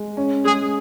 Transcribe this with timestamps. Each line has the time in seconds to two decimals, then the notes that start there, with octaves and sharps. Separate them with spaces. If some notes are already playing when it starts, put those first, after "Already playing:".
Already playing: G#3
0.17 C#4
0.45 G#3 G#4